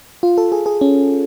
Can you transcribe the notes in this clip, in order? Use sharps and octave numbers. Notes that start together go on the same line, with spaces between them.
F4
A4
G#4
G#4
C#4